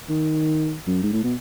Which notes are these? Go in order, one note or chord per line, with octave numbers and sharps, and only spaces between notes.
D#3
F#2
G#2
A2
B2